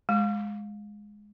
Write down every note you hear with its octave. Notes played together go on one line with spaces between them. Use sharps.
G#3